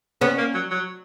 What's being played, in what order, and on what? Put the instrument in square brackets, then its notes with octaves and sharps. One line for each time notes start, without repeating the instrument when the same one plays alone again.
[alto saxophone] B3 [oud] C#4
[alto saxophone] A#3
F#3
F#3